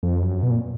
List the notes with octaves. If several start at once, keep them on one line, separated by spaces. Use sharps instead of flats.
F2
F#2
B2
A#2